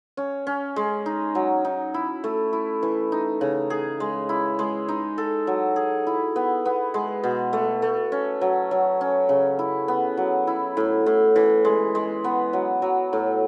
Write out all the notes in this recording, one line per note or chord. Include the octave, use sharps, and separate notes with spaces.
C#4
C#4
G#3
D#4
F#3
D#4
E4
A3
E4
E3
D#4
C#3
G#4
G#3
E4
G#3
D#4
A4
F#3
G#4
E4
B3
B3
G#3
B2
A3
A3
C#4
F#3
F#3
C#4
C#3
E4
B3
F#3
E4
A2
A2
E3
G#3
G#3
B3
F#3
F#3
A2